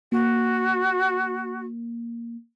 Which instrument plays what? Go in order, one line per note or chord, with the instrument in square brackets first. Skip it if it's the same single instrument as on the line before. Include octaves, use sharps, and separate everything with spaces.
[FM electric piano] A#3 [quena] F#4